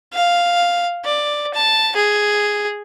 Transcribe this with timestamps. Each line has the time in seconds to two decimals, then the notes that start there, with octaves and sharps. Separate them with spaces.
0.13 F5
1.05 D5
1.54 A5
1.95 G#4